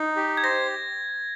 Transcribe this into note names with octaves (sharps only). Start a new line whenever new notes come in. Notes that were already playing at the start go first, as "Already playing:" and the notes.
Already playing: D#4
G4
G#6
C5 A#6